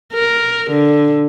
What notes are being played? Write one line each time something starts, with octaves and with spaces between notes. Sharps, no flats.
A#4
D3